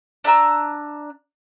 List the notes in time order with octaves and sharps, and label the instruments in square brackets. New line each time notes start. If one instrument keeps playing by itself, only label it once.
[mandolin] D4 E5 A#5 E6